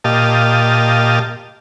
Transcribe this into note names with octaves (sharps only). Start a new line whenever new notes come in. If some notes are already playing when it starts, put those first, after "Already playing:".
A#2 G4 D#5 F5 A5